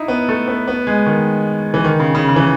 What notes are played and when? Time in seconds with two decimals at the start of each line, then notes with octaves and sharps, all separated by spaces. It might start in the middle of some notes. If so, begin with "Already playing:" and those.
Already playing: D#4 E4
0.08 B3
0.28 A3
0.48 B3
0.68 B3
0.87 G#3
1.06 D#3
1.74 E3
1.84 D#3
2.00 C#3
2.15 C#3
2.28 C#3
2.36 E3